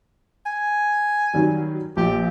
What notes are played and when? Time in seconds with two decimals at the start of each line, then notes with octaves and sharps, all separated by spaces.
0.46 G#5
1.34 D#3 F#3 G3
1.97 A#1 A#2 G4